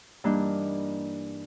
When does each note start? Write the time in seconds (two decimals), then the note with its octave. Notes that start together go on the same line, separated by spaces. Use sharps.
0.24 G2 E3 A#3 D4 D#4